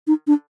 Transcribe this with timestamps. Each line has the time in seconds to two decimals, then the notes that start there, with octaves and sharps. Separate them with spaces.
0.07 D#4
0.27 D4